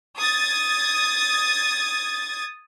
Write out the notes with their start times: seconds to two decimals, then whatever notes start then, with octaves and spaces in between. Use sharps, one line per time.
0.17 D#6 G#6 A6